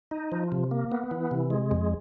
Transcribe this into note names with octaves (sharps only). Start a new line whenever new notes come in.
D#4
F3
C3
A#3
B3
E3
C3
G#3
F2